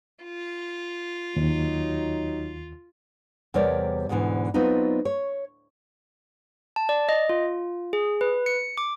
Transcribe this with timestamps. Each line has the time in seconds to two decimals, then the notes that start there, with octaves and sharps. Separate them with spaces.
0.24 F4
1.36 D#2 F#3 D#4
3.54 E2 C3 G3 A#4 C#5 D5
4.09 D2 G#2 B2 D3 E3
4.54 F#3 B3 C4 D4 D#4 F4
5.05 C#5
6.76 A5
6.89 D5
7.09 D#5
7.29 F4
7.93 G#4
8.21 B4
8.46 C#7
8.78 D6